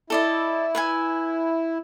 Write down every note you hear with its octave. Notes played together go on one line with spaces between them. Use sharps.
E4 A4 D5 D#5
B4 E5 G#5